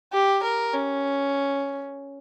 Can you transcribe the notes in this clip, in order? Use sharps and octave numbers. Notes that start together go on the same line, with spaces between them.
G4
A#4
C#4